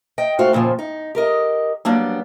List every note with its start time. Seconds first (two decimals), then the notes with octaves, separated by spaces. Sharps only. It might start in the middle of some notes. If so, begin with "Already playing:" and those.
0.18 D#5 G5
0.39 G#2 A3 F#4 C5 F5
0.53 F2 A#2 C#3 F3
0.79 D#4
1.15 G4 A#4 D#5
1.85 F#3 G3 A#3 B3 D4